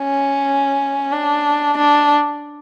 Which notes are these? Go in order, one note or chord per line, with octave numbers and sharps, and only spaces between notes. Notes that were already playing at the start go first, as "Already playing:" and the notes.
Already playing: C#4
D4
D4